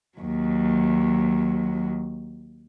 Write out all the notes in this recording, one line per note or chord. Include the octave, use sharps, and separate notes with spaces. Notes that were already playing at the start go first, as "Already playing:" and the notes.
D#2 F#3